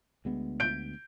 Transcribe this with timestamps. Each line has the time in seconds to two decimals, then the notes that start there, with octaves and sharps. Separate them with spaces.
0.25 D2 G#3 B3
0.60 G6 D7